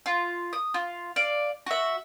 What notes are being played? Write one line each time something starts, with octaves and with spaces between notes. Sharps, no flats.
F4
D#6
F4
D5 F5
F#4 E5